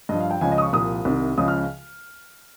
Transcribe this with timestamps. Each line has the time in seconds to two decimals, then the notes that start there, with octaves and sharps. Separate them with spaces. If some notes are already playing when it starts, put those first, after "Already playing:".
0.09 G2 F3 D#5
0.20 F5
0.31 G5
0.41 C#2 C#3 F3 G#5
0.52 D#5
0.58 D#6
0.62 C#6
0.73 C2 A#2 F3 D#6
1.05 C2 C3 D#3
1.38 C#2 C#3 F3 D#6
1.48 F6